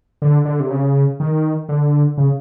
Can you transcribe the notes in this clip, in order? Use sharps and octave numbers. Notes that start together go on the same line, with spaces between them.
D3
D3
C3
C#3
D#3
D3
C#3